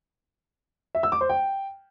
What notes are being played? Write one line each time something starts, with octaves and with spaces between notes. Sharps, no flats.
E5
E6
D6
C5
G5